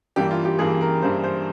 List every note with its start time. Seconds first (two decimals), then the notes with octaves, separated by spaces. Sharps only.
0.16 G2 E3 G3 A#3 G4
0.31 F4
0.45 G4
0.59 G2 E3 G3 A#3 G#4
0.81 A#4
1.02 G2 E3 G3 A#3 C5
1.24 C5